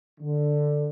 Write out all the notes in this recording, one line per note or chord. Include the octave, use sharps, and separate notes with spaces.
D3